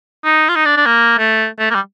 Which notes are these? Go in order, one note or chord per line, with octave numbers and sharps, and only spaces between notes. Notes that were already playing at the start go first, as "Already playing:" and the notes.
D#4
F4
D#4
D4
D4
A#3
A3
A3
A#3
G3